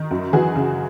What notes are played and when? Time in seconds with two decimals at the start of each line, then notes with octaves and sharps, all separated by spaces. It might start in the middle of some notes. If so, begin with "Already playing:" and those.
Already playing: D#3
0.11 F#2
0.33 E3 F#4 G#4
0.56 C#3